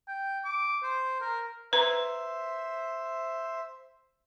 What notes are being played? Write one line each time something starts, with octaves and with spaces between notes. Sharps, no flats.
G5
D6
C5
A#4
B4 C5 E5 A#5